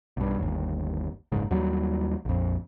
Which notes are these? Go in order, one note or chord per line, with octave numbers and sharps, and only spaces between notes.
B1 G2
G1 D#2
F#1 C#2 G#2
D#2 F#3 G3
A#1 F2